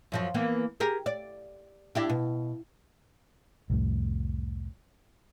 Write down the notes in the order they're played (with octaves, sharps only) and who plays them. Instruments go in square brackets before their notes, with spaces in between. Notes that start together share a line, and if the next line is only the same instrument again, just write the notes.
[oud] F#2 F3 F#3
E3 A#3 B3
G4 G#4 A#4
D5
D4 E4 G4
B2
[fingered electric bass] C2 F2 A2